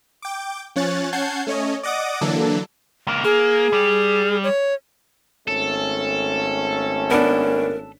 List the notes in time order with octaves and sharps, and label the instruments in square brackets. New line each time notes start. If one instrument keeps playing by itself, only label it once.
[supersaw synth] G5 D6
F3 C#4 C#5 F#6 A6
C#4 F#5 A5 G6 G#6 C7
A3 C#4 C#5 D#5
D5 D#5 F#5 D6 D#6
D3 E3 F#3 A#3 D4 A4
[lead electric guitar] C#2 A#3
[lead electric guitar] A#3 [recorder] G#4
[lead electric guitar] G3
[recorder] C#5
[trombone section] G#1 A3 C#4 [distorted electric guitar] A4
[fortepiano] B3 D4 [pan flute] A#4